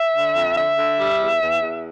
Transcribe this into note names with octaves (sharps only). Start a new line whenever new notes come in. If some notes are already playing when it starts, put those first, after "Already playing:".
Already playing: E5
D3
F2
D3 E5
D3
G3
E2
E2
E2